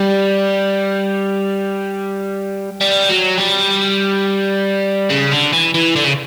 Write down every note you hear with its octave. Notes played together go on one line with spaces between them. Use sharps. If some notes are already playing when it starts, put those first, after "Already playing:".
Already playing: G3
G3
F#3
G3
C#3
D3
E3
E3
D3
C#3